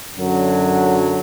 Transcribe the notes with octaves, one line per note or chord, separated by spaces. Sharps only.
F#2 D3 F#3